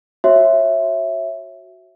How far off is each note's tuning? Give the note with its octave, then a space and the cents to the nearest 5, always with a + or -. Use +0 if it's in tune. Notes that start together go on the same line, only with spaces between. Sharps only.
F#4 +0 C#5 -30 E5 +0